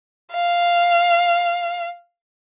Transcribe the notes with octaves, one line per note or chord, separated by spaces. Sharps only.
F5